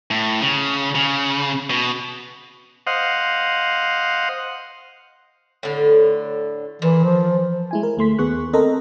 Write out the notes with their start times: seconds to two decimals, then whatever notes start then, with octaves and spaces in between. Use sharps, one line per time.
0.11 A2
0.41 C#3
0.95 C#3
1.70 B2
2.87 C5 D#5 F5 F#5
5.63 A2 D3
6.82 A#2 E3
7.04 F3
7.71 G#3 E4 G#5
7.83 A#4
7.97 D2 A3 C6 B6
8.19 D#2 B3 G#4 C#6 F#6
8.53 C4 A4 A#4 C5 D#5 A#5